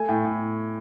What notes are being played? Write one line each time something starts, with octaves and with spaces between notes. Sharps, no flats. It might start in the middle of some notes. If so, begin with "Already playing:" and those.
Already playing: A3 G#5
A2 G5
A2